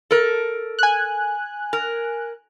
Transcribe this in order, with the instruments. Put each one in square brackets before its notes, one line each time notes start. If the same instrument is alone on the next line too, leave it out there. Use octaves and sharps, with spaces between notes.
[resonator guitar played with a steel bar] A4 A#4
[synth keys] G#5 F#6
[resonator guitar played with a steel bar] A#4